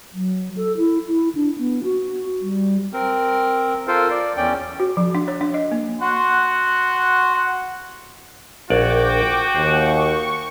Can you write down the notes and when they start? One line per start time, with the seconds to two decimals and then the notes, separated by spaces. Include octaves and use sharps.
0.14 F#3
0.56 A4
0.78 E4
1.07 E4
1.35 D4
1.58 B3
1.84 F#4
2.41 G3
2.93 C4 A#4
3.87 F4 A4 A#4 C5
4.10 D5
4.37 E2 C#4 D5 G5
4.80 F#4
4.97 F3
5.15 D4
5.28 C#5
5.41 D4
5.54 D#5
5.72 A#3
6.01 F#4 F#5 C6
8.70 A#1 F#4 D5 G5 D6
9.55 D#2 C5 C#6